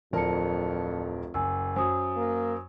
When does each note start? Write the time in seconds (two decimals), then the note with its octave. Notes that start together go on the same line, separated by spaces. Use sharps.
0.13 D1 F2 F3 A#4 D5 A5 C#7
1.34 F#1 G#5 E6
1.76 F#2 F#3 C5 G#5 D#6
2.17 A#3